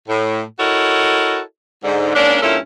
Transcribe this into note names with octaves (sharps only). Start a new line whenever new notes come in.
A2
E4 F#4 A4 A#4 C#5 D#5
G#2 D3
G#2 A#3 C#4 D4
G2 A#2 C#4 E4 F4 A4